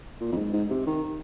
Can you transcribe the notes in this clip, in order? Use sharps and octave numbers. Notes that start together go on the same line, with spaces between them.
A#2
F2
G#2
G#2
C3
D#3